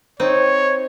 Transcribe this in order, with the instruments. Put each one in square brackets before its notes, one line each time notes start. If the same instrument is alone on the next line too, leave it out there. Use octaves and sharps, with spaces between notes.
[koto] C4 D#4 [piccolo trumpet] C#5